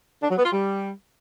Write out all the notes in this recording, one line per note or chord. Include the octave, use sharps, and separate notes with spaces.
D4
F#3
B3
F4
G3